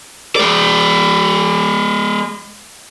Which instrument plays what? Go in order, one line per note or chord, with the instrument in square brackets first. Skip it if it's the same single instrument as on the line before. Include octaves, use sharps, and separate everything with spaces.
[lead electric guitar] G#3 D5